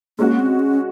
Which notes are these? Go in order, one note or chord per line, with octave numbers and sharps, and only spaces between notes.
G#3 A#3 C#4 F#4
C4
C#4